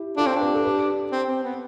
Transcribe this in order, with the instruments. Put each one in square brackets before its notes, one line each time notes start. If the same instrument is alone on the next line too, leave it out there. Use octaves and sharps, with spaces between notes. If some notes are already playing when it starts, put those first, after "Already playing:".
Already playing: [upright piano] E4 G4
[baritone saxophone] D4 [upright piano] F4 A4
[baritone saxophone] C4
[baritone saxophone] D4 [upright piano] G4 B4
[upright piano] A4
G4 B4
[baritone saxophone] C4
C4
B3